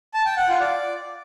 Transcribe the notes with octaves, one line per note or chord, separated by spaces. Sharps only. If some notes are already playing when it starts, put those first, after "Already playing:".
A5
G5
F#5
F4
D5